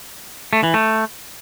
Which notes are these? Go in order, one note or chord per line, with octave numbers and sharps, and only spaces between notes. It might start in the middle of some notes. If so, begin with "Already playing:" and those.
A3
E3
A3